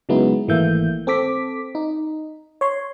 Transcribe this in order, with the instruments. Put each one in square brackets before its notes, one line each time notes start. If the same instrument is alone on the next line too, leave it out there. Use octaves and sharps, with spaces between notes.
[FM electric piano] C#3 F#3 G#3 B3 D#4 E4
G#1 E3 A3 A#3 E5 G6
C4 A4 D6 B6
D#4
C#5 C6